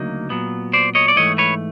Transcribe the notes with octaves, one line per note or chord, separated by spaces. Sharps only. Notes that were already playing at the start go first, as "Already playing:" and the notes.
Already playing: D2 C#3 F#3 A#3 D#4
A#2 F#3 B3
C5 D5
C#5 D#5
D5
G#2 E3 A3 C#5 D#5
B4 C#5